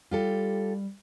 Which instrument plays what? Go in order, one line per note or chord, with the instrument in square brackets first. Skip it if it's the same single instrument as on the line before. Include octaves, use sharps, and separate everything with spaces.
[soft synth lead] G3 [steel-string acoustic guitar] F4 G4 A4